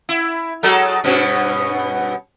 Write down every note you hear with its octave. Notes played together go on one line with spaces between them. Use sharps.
E4
F#3 G#3 A4
G2 B2 C#4